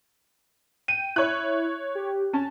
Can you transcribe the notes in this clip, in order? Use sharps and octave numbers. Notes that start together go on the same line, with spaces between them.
G5 D#7
E4 C#5 F#6
G4
C#4 A5